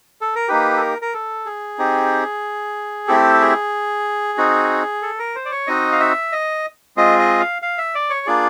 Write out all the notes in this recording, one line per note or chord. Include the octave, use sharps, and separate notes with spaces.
A4
A#4
A#3 D#4 G4 B4
A4
A#4
A#4
A4
G#4
C4 D#4 G4
A3 C4 E4 G4 A4
G#4
C4 D#4 F#4
A4
A#4
C5
D5
C#5
C4 D#4 F#4 D#5
F5
E5
D#5
G#3 C4 F4 G#4 D#5
D#5
F5
F5
E5
D5
C#5
A#3 D4 F4 G#4 D5